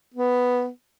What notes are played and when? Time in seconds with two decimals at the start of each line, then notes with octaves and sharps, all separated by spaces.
0.14 B3